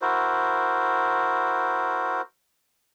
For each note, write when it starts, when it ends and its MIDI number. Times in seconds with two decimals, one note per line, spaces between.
0.02 2.21 64
0.02 2.21 66
0.02 2.21 70
0.02 2.21 72